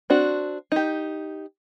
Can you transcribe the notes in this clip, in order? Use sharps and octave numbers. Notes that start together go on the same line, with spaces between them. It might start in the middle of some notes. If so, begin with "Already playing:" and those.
C4 D4 F#4
D#4 G4